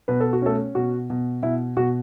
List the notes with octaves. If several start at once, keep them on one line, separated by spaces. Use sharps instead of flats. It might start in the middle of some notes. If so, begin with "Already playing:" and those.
B2 B4
A4
F#4
A3 C#4 A4
B2 F#4
B2
B2 E4
B2 F#4